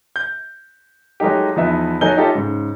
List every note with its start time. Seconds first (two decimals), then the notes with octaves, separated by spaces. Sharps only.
0.16 G6
1.20 F#3 G#3 A3 D#4 G4
1.56 E2 F3 B3 D#4 E5
2.01 F#3 A3 D#4 G#5 G6 G7
2.17 D#4 F4 G4 A4 C#5 E5
2.35 G#2 C#3